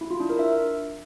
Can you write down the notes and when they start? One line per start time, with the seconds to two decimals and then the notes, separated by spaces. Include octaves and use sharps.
0.01 E4
0.11 F4
0.20 D4
0.30 A#4
0.39 E5